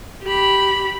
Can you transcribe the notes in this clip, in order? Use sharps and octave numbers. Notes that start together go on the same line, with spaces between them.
G4 B5